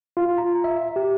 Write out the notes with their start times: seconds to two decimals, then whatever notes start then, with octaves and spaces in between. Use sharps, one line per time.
0.17 F4
0.38 A#5
0.64 E5
0.96 G4